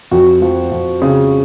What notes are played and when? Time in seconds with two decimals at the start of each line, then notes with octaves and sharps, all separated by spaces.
0.11 F2 F#4
0.42 F3
0.72 F2
1.02 C#3